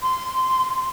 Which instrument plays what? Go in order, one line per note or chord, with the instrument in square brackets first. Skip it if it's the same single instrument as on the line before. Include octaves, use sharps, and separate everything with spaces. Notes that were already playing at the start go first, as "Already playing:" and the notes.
[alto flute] C6